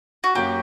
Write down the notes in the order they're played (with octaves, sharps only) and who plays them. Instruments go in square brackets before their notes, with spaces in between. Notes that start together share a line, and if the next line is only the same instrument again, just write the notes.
[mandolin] F#4
[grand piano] F#2 F#3 A#3 [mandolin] G4